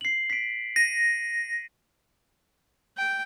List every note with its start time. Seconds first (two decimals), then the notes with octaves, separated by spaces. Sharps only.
0.01 C7 F#7
0.30 B6 D7
0.76 A#6 D#7
2.97 G5